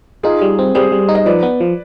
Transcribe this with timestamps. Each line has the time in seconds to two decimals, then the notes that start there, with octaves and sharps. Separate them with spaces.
0.23 D#4 F4 G#4
0.41 G3
0.59 C4
0.75 G3 G#4 C5
0.92 G3
1.08 D#4
1.15 D#5
1.26 F3 B4 D5
1.43 B3
1.60 F3